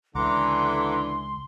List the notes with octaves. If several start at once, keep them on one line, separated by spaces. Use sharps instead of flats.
C#2 D3 E3 F#5 A#5 C6 D6